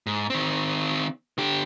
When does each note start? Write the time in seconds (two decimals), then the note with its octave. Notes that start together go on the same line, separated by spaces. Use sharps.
0.07 G#2
0.30 D#3 C4
1.38 D3 G4